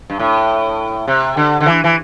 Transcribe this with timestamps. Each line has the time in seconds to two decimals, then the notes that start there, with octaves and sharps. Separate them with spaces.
0.10 G2
0.19 A2
1.07 C3
1.37 D3
1.61 D3
1.66 E3
1.84 E3